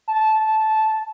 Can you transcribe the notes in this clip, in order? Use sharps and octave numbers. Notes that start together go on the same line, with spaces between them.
A5